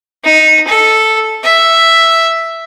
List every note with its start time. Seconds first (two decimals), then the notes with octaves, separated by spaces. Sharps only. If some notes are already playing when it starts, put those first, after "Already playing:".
0.24 D#4
0.67 A4
1.43 E5